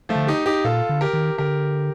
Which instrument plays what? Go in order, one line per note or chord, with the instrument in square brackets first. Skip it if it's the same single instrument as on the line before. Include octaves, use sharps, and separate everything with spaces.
[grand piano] F3 A3
[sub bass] D3
[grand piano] D#4 G4
D#4 G4
[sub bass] A#2 [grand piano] F4 A4
[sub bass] D3
[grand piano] G4 A#4
[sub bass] D#3
[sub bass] D3 [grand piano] G4 A#4